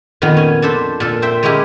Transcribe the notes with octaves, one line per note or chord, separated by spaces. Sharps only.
F2 A#2 D#3 B3
C#4 G#5
D4 A4 C5 B5
A#2 A4
C5 E5 G5
G#3 A#3 C#4 E4 G4 G#4